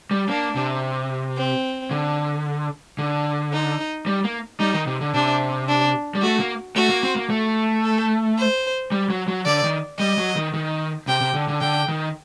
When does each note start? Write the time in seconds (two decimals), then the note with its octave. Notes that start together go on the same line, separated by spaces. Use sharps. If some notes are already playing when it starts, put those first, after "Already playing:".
0.11 G3
0.29 A#3 D4
0.56 C3
1.37 C4
1.91 D3
2.99 D3
3.53 D#4
4.06 G3
4.24 A#3
4.60 G3 D#4
4.74 D#3
4.87 C3
5.01 D3
5.14 C3 D4
5.68 D4
6.15 G3
6.22 A3 F#4
6.40 A#3
6.76 A3 F#4
6.90 A#3
7.03 C4
7.16 A#3
7.30 A3
7.84 A4
8.38 C5
8.92 G3
9.10 F#3
9.28 F#3
9.45 D3 D5
9.64 D#3
9.99 G3 D#5
10.18 F#3
10.36 D#3
10.54 D#3
11.08 C3 G5
11.21 C3
11.34 D3
11.48 D3
11.61 D3 G5
11.89 D#3